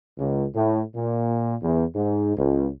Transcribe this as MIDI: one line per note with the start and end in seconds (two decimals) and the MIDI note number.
0.18 0.45 37
0.55 0.81 45
0.94 1.54 46
1.62 1.83 40
1.95 2.33 44
2.35 2.67 37